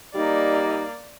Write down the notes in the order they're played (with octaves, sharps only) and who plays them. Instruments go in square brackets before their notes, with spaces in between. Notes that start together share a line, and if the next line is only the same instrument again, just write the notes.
[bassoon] G3 [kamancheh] A#3 D5 [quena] D#4